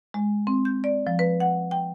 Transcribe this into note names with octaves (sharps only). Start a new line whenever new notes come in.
G#3
C4
G6
D5
F3
B4
F#5
G5